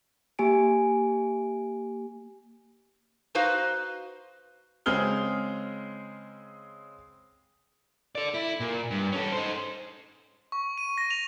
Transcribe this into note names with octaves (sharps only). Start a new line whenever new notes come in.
A#3 G4 G#5 D7
D#4 F#4 B4 C5 F5
C#3 G#3 C4 G#4 F6 G7
A4 D5
E4
A#2
G2
C#4 A4
D#4 C5
C#6
D#7
A#6
F7